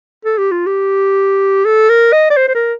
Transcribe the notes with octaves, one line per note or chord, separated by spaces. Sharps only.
A4
G4
F4
G4
A4
A#4
D#5
D5
C5
C5
A#4